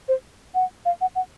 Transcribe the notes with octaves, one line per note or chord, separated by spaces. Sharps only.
C5
F#5
F5
F#5
F#5